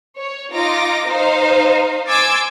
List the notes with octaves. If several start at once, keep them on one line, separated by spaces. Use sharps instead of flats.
C#5
D#4 F4 D6 A#6
D#4 C5 F5
G#5 C6 D6 E6 G#6 A6